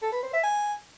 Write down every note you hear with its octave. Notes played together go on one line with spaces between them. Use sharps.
A4
B4
C5
E5
G#5